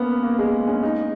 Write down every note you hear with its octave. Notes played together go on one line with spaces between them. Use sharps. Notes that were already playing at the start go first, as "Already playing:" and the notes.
Already playing: A#3 B3 C#4
A#3
G#3
C#4
D#4